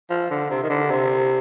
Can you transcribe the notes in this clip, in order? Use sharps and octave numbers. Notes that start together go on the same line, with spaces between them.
F3
D3
C3
D#3
D3
C3